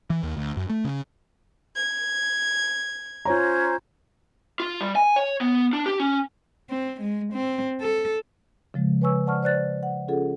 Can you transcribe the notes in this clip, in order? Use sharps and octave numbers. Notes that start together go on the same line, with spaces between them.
E3
D#2
D2
F#2
A3
C#3
G#6
C#4 F4 C5 C#5 A#5 G#6
F4
G3
G#5
C#5
B3
D4
G4
C#4
C4
G#3
C4
A4
C#3 F3 G#3
B4 C#5 G#5 C#6 E6
C5 D5 F#5 A5 C#6 F6
C5 D5 F#6 A6
F#5
C#4 F4 G#4 A4 F#5